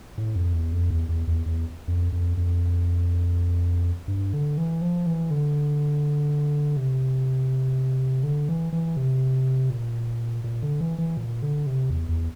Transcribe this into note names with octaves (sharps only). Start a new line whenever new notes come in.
A2
F2
E2
F2
E2
E2
E2
E2
F2
F2
F2
G2
D3
E3
F3
E3
D3
C3
D3
E3
E3
C3
A#2
A#2
D3
E3
E3
A#2
D3
C3
E2
E2